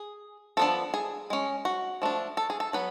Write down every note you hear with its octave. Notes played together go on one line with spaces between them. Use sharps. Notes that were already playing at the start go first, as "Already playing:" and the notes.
Already playing: G#4
F3 B3 D4 A4
G#4
G#3 C#4
F#4
F3 A3 D4
A4
G#4
A4
F#3 B3 B4